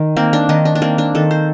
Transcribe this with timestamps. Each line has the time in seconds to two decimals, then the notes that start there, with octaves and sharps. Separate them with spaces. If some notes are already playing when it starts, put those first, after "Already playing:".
Already playing: D#3
0.17 A#3 C4
0.33 D4
0.49 D#3 D#4
0.65 D4
0.75 D4
0.82 A#3 C4
0.98 D4
1.15 D#3 A4
1.31 C5